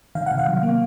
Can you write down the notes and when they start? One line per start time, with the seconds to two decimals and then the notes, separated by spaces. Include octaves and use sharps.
0.15 D#3 F5
0.26 C3 F#5
0.38 F5
0.48 F#3
0.63 A#3